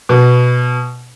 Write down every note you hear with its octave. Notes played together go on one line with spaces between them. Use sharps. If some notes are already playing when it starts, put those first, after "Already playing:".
B2